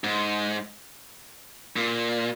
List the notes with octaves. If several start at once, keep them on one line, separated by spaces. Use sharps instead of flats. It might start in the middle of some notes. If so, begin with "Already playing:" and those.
G#2
A#2